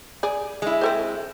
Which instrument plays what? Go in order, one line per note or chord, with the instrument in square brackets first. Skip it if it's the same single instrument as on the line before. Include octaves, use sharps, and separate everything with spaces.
[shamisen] G#4 D5
[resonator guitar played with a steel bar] G#3 E4
[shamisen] C4 A4 C5